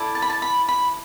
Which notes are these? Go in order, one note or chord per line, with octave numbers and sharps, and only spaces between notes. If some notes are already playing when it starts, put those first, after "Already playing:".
Already playing: E4 A4 D5
A5
B5
A5
B5
B5